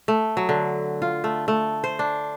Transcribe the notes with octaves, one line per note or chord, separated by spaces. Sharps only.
A3
F#3
D3
F4
A3
A3
C5
D4